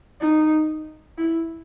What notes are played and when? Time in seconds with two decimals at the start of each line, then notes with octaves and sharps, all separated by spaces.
0.21 D#4
1.18 E4